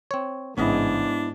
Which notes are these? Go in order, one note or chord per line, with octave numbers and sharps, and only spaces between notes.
C4 C#5
A1 G#2 C#3 B3 D4 E4 D#5